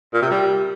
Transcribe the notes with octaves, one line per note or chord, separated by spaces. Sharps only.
A#2
C3
G3